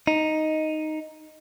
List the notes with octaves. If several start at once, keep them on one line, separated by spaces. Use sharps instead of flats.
D#4